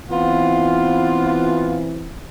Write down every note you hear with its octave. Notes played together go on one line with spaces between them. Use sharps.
E3 B3 C4 F4